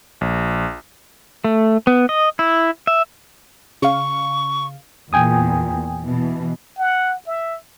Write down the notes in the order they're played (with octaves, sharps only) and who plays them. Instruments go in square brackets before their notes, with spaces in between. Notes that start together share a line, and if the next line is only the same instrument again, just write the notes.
[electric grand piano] A#1
[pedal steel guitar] A3
B3
D#5
E4
E5
[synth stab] C#3 F5 [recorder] C#6
[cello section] E2 A#2 [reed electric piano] G5 G#5 D#6
[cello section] B2 E3
[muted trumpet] F#5
E5